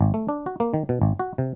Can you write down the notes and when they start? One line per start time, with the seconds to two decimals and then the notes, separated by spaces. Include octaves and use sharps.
0.01 G#1
0.14 A3
0.29 D4
0.46 F#4
0.60 A#3
0.74 D#3
0.89 B2
1.02 G#1
1.19 F#4
1.38 C3